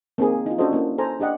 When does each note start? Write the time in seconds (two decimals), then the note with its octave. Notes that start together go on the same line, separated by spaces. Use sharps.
0.18 A#3 C4 D#4 G#4
0.46 D#4 F4
0.58 C#4 D4 F#4 A4 C5 D#5
0.71 A#3 C#4 E4
0.98 A4 C5 G#5 A#5
1.20 D4 G4 D#5 F#5